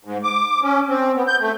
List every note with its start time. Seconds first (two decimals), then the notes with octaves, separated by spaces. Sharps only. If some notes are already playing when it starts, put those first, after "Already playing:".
0.05 G#2
0.23 D6
0.63 C#4
0.89 C4
1.15 B3
1.27 G6
1.40 A3